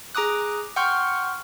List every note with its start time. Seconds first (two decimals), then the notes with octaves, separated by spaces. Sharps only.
0.15 G#4 A#5 D6 D#6 F#6
0.76 F#5 G5 C6 C#6 F6 G6